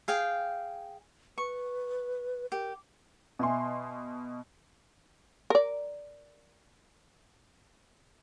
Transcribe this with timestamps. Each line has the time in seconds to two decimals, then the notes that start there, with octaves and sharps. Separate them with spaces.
0.08 G#4 F5 G5
1.38 B4 C#6
2.52 G4 A#4
3.39 B2 D#5 E5 G#5 C6
5.50 A#4 D5